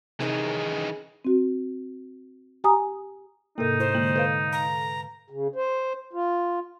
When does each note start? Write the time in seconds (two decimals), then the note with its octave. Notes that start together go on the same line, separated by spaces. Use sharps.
0.20 C3 D#3 E3 C#4 D#4 G#4
1.25 C4 F#4
2.64 G4 G#5 A#5 D#6
3.58 G#2 C3 A#3 D#4 A4 A#4
3.80 E4 C5
3.94 D3 G#3 A#3 F#7
4.16 A4 B4 F5
4.53 A#5
5.30 C#3
5.55 C5
6.13 F4